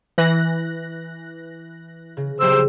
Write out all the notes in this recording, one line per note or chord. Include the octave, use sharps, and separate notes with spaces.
E3 F#6 A#6
C#3
A#1 F#3 G4 G#4 C5 E6